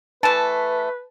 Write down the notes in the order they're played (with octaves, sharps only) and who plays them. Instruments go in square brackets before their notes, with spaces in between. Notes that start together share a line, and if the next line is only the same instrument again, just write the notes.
[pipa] E3 A3 [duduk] B4 [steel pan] A5